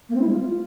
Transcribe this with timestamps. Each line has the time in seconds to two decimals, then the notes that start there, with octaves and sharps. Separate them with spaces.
0.09 A#3
0.15 C4
0.21 E4
0.27 G#3
0.33 F4